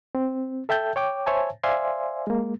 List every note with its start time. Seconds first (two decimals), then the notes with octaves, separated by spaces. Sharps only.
0.15 C4
0.69 A4 E5 G5 A5 G6
0.96 C#5 G5 D6
1.26 C5 C#5 E5 G#5 A5
1.63 C5 D5 E5 F5 G#5 C6
2.27 G#3 A#3